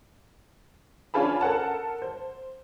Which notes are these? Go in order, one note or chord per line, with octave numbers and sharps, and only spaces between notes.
C#4 D4 F4 G#4 A5 B5
A4 A#4 F#5 A5
C5